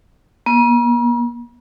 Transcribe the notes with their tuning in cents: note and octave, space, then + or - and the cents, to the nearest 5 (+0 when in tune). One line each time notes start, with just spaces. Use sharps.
A#3 +45